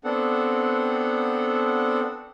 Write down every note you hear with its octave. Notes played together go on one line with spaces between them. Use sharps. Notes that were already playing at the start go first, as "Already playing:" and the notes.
B3 C4 D4 A4 F#5